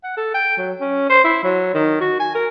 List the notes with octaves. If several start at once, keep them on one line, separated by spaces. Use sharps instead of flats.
F#5
A4
G5
F#3
C#4
C5
E4
F#3
D#3
F#4
G#5
A#4